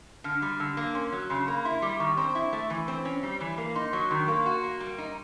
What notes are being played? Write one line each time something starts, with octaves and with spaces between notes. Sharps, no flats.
D3 F6
G3
D3 E6
A#3
C#4 C6
F#3
C#3 C6
A#3 B5
E4 C6
G3 D6
D#3 C#6
C4 C6
E4
A3
E3
C4
C#4
G3
E3
A#3
D#4 C6
F#3 C#6
D#3 C6
C6
A#3 C#6
F#4 C6
A#3
G3
D#4